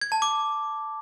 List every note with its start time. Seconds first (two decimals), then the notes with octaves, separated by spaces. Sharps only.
0.01 G#6
0.12 A5
0.22 D6